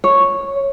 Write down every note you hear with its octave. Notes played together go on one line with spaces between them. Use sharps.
C#5